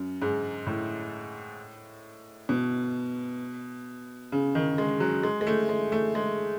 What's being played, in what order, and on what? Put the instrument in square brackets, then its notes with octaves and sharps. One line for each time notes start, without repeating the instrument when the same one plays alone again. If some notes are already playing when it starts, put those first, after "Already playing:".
Already playing: [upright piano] F#2
G#2
A2
B2
C#3
D#3
G#3
F#3
G#3
G#3
A3
G#3
A3
G#3